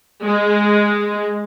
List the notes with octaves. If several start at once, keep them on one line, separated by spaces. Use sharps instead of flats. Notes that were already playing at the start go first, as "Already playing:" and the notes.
G#3